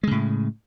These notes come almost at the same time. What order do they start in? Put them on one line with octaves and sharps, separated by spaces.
G#3 C#3 A2